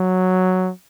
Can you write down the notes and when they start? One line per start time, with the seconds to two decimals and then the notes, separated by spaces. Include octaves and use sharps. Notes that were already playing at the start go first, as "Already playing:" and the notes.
Already playing: F#3